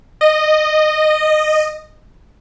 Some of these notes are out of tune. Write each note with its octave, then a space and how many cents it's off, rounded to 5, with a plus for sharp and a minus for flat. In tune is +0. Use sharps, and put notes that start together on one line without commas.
D#5 -15